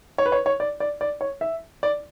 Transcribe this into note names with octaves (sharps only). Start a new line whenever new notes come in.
C#5
B4
C#5
C#5
D5
D5
D5
C#5
E5
D5